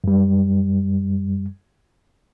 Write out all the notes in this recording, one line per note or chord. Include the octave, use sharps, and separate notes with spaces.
F#2 G3